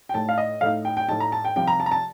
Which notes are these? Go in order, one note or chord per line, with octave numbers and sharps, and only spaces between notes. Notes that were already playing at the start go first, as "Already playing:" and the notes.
G5
A2 A3 D#4 A5
F5
D#5
A2 A3 D#4 F5
G5
G5
A2 A3 D#4 A5
A#5
A5
G5
C2 C3 F3 G5
A#5
A5
A#5
A5